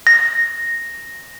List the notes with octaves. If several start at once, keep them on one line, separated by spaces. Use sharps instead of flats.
A#6